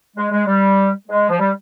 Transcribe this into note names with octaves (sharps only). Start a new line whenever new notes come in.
G#3
G#3
G3
G#3
F3
G3